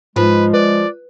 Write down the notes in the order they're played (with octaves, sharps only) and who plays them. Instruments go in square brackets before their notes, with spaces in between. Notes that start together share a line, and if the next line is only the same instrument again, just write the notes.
[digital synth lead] G#2 [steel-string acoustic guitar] F3 [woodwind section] G#3 [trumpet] B4
[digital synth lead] B4 [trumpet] D5